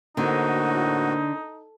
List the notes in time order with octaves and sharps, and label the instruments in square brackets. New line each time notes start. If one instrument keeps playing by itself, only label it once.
[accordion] A2 F#4 [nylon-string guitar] D3 [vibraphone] A#3 A#4 C5 [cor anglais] D#4